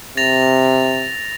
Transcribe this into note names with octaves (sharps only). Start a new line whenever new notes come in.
C3 A6 A#6 F7